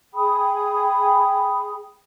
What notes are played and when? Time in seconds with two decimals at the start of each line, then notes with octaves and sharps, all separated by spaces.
0.14 G#4 G5 B5 D#6